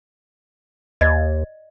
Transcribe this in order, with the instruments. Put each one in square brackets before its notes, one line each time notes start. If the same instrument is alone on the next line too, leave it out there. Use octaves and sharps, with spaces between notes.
[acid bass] D#2 [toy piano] D5 D#5